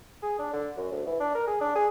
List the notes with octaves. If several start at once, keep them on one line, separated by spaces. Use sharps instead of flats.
G#4
D4
D3
F#2
D2
E3
D4
A#4
G#4
D4
G#4